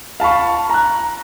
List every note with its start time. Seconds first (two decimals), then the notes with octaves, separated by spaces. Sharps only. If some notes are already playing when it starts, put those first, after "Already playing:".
0.20 F5 A5 B5 C#6
0.70 A#5 F#6